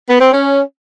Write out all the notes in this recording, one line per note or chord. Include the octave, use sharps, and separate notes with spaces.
B3
C4
C#4